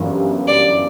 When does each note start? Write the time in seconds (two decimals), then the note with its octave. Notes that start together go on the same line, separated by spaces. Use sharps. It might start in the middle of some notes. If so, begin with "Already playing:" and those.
Already playing: G1 F#2 E3 G3 B3
0.48 D5